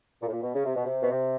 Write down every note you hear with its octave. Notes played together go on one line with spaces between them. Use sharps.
A#2
A2
A#2
B2
C#3
C3
B2
C3
B2
C3